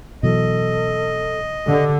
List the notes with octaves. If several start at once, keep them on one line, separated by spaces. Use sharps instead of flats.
B2 E3 F#3 A4 D#5
D3 G4